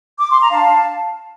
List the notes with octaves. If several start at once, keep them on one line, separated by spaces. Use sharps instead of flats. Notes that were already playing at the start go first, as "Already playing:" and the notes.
D6
C6
A#5
D4 F5 A5